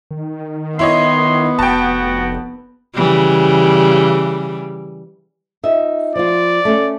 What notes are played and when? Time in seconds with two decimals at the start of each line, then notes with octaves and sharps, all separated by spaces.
0.11 D#3
0.79 B3 E4 C#5 D#5 C6
1.59 F1 F#4 G5 A5
2.95 C#3 E3 G3
5.63 D#4 F4 E5
6.16 F3 F4 D5
6.65 A3 C#4